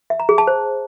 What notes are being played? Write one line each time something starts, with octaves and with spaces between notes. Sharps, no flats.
E5
A#5
G#4
A5
C5